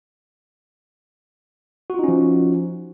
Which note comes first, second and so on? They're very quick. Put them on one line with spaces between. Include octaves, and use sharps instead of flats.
F#4 F4 D#4 C#4 F3